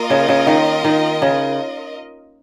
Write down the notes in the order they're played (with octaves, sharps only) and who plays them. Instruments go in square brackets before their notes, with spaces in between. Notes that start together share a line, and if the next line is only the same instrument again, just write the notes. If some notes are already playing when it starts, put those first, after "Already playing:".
Already playing: [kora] A#3 [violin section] F4 A#4 D#5
[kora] C#3
C#3
D#3
D#3
C#3